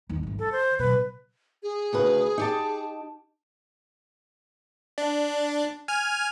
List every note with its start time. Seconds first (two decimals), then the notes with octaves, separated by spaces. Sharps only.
0.09 D#2 D#4
0.23 G#1 E3
0.39 D3 A4
0.52 C5
0.79 B2 F#3 B4
1.63 G#4
1.93 D2 C#3 B4
2.38 D#4 G4 A5
4.98 D4
5.88 G#5 F6